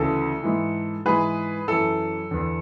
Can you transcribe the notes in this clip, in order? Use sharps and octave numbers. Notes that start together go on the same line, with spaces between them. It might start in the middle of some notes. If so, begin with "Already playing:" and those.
Already playing: D2 C#3 E3 A4
G#2 E3
G#2 E3 G#4 B4
F#2 E3 A4
E2 D3